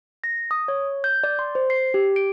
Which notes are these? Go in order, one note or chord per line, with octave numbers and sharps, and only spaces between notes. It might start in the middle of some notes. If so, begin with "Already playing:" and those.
A#6
D#6
C#5
G6
D5
C6
C5
C7
G4
D7